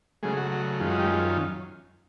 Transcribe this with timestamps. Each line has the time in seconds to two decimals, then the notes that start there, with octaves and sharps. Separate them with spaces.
0.23 C#3 F#3 G#3 A3 G#4
0.37 F#4
0.52 F#4
0.80 F#2 D#3 G#3 C#4 F4
0.90 F#4
0.99 G3 G4